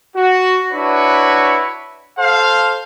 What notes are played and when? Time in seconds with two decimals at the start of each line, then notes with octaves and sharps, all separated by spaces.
0.15 F#4
0.72 D4 E4 F#4 B4 C#5
2.18 A4 C5 F5